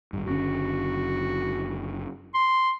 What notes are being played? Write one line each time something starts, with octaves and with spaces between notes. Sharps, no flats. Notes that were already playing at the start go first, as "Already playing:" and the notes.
G#1 G2
F#1 D3 C#4 F#4
C6